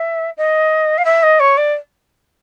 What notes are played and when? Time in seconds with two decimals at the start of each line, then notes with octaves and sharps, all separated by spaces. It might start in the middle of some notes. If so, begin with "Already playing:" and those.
Already playing: E5
0.37 D#5
0.98 F5
1.05 E5
1.23 D#5
1.39 C#5
1.57 D5